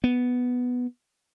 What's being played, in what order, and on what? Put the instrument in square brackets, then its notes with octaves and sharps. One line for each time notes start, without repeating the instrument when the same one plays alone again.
[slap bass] B3